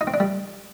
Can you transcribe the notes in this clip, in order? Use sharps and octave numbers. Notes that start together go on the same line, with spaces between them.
D#4
C4
D4
G3